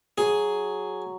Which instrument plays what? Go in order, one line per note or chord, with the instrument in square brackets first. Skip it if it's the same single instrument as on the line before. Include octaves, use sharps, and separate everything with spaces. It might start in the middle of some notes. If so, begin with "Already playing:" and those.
[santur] F#3 [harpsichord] G#4